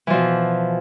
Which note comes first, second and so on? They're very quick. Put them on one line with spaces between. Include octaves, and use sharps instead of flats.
E3 F3 B2